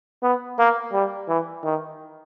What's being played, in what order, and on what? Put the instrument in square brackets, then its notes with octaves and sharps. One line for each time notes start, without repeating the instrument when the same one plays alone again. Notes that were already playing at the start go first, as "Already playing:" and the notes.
[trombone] B3
A#3
G3
E3
D#3